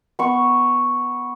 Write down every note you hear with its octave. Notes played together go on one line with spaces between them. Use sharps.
B3 C#6